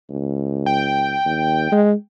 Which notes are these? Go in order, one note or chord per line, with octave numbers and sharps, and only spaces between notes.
C#2
G5
D#2
G#3